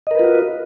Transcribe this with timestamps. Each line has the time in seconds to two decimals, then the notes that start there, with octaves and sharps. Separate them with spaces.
0.07 D#5
0.11 A#4
0.15 B4
0.19 F4
0.24 F#4